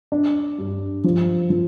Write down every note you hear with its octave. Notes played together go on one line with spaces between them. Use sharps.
D4
G2
F3
F3